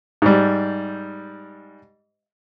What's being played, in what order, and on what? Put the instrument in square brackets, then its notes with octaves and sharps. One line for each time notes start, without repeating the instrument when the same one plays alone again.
[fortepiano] G#2 G3